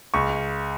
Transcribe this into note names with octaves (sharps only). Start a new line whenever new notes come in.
C#2 C#6